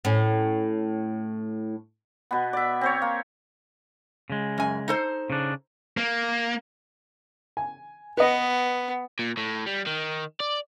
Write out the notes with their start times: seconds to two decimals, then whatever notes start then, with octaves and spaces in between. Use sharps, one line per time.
0.05 A2 C#4
2.31 B2 B3
2.53 D5 E5
2.81 C4 C5 C#5
3.02 A#3
4.30 C#3 G#3
4.58 F#2 G#5
4.88 D#4 A4 C5
5.30 C#3 D4
5.97 A#3
7.57 G#5
8.17 B3 B4 D#5
9.19 A#2
9.37 A2
9.66 G3
9.87 D#3
10.40 D5